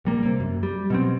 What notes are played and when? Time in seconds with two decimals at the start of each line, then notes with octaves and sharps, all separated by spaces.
0.05 A#1 G3 A#3
0.23 C3 A#3
0.40 F#2
0.63 G3
0.90 B2 F#3 C4